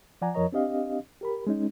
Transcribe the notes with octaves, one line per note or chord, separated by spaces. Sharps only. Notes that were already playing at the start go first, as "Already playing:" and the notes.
F3 D5 F#5 G#5 A#5
F2 F3 A#4 C#5 D#5 A#5
C4 D4 G4 D#5 F5
G4 A#4 B5
G#3 C#4 D#4